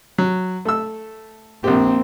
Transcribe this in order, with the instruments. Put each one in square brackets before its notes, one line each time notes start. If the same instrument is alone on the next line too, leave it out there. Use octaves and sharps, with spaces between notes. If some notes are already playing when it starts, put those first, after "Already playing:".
[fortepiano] F#3
A3 E6
[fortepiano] A#1 G4 [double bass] A#3 C4